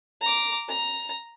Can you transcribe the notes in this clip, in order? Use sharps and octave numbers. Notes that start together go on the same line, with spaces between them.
A#5 D6
A#5